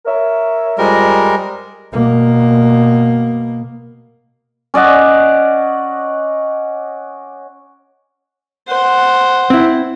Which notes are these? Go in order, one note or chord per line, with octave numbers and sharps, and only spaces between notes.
A#4 C#5 E5
F2 G3 G#3 A#4
B2 A#3
C#4 D5 D#5 F#5
C5 F#5
C4 E4